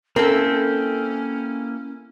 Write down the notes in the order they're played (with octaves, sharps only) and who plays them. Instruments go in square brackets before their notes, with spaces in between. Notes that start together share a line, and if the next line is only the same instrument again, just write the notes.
[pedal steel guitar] A#3 E4 G5 [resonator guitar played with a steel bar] C4 A4 [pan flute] C#4 [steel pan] A#4